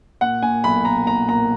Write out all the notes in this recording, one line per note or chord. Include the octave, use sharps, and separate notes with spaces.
A#2 F#5
A#2 G#5
B1 B5
B1 A#5
A#2 A#5
A#2 A#5